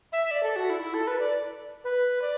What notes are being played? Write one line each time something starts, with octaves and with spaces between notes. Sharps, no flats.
E5
D5
A4
F#4
E4
E4
A4
B4
D5
B4
D5